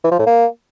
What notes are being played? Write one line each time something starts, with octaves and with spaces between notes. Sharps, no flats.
E3
F3
A2
A#3